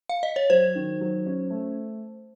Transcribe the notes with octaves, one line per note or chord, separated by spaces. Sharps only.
F5
D#5
C#5
F#3 C5
D#3
F#3
C#4
A3